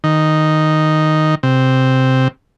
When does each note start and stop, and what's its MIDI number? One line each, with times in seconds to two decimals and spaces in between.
0.04 1.35 51
1.43 2.28 48